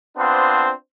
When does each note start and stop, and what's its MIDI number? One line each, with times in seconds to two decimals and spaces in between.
0.17 0.71 59
0.17 0.71 60
0.17 0.71 62
0.17 0.71 65
0.17 0.71 72